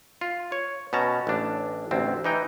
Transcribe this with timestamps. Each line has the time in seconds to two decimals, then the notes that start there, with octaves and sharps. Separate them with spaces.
0.21 F4
0.52 C#5
0.93 B2 C#4 A5 A#5
1.27 A1 D4
1.91 A1 D2 C4
2.24 E3 D#4 G5